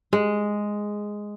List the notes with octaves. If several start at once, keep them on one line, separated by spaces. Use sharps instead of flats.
G#3